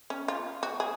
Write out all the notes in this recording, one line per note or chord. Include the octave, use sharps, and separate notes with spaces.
C#4
F4
F#4
G#4